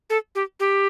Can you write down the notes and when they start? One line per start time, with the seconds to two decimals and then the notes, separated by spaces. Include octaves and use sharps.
0.10 A4
0.35 G4
0.60 G4